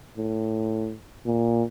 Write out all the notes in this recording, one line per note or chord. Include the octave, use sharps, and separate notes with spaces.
A2
A#2